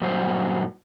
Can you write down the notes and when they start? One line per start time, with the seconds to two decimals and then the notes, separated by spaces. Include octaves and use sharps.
0.01 G2 A#2 F#3 F#4 C5